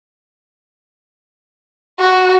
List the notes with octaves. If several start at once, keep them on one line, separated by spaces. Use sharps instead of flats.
F#4